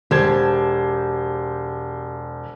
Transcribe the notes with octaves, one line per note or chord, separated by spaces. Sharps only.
E1 G4 C5 A5 G#6